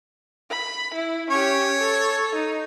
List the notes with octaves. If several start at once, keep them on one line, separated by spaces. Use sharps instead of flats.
B5
E4
C#4 G4 C#5
A4
D#4